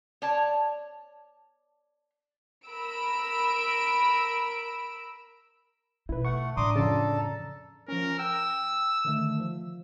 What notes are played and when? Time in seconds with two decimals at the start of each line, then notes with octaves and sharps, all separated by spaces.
0.22 C#5 D5 A5
2.66 A#4 B5 E6 D7
6.09 B2 D#4 E4 B4
6.25 A3 F#5 C#6
6.57 A2 E3 D4 A#5 C6 D6 D#6
6.76 F2 C#3 A4 A5
7.88 F3 C#4 A#4
8.19 G5 E6
9.05 D3 D#3 A3
9.40 F3